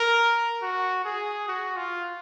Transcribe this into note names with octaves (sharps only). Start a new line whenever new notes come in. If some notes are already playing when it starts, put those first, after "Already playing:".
Already playing: A#4
F#4
G#4
F#4
F4